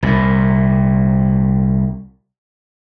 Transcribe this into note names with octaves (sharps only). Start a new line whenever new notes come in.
C2 A#2